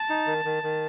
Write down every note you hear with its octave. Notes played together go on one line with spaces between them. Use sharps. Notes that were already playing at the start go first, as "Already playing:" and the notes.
Already playing: A5
D#4
D#3
D#3
D#3